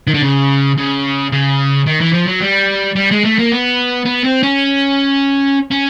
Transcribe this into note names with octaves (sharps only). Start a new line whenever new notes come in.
D#3
D3
C#3
C#3
C#3
D#3
E3
F3
F#3
G3
G3
G#3
A3
A#3
B3
B3
C4
C#4
C#4